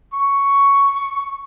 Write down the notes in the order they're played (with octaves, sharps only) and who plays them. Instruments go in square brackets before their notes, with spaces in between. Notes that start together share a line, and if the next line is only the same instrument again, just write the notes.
[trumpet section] C#6